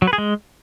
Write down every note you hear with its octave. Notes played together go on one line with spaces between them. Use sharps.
F#3
B4
G#4
G#3